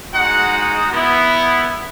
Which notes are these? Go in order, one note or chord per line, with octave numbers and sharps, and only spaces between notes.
G#3 D#4 F#4 F#5
B3 E4